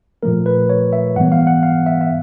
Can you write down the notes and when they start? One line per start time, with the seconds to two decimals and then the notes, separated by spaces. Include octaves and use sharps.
0.23 A#2 F3 A3 A#4
0.46 B4
0.70 C#5
0.93 E5
1.16 G#2 E3 G3 B3 F#5
1.32 F5
1.47 F#5
1.63 F5
1.86 E5
2.01 E5